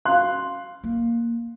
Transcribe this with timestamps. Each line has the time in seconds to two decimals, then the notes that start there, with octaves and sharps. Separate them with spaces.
0.05 F5 C6 F#6
0.84 A#3